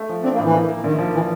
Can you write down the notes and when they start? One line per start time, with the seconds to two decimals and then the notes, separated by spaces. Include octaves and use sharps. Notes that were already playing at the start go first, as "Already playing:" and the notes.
Already playing: A3
0.09 F3
0.23 C4 D4
0.34 A#3
0.39 A2
0.44 E3
0.53 A#3
0.68 A#3
0.84 A#1 D#3
0.99 F3
1.14 E3